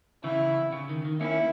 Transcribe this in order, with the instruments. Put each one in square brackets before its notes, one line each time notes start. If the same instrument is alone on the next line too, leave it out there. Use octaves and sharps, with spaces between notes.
[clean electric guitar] C#3 E3 [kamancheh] E4
[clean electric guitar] C#3
D#3
D#3
[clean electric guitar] A#3 C#4 [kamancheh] E4